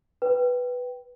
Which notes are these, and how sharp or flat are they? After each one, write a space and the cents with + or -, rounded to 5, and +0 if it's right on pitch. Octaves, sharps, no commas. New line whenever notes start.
B4 +0 G5 -10